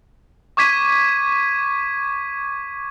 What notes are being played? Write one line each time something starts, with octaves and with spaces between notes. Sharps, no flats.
C#6 D6 G#6 B6 D#7